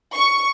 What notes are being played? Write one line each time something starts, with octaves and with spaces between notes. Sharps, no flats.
C#6